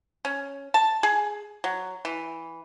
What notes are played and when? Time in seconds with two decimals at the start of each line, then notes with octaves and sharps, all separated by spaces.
0.25 C#4
0.74 A5
1.03 G#4
1.64 F#3
2.05 E3